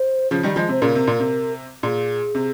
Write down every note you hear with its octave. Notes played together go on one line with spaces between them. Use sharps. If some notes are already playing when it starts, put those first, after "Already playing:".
Already playing: C5
C#3 F3
D#3 G3
F3 G#3
C3 C5
A#2 C#3 A#4
C3
A#2
C3
A#2 G#4
C3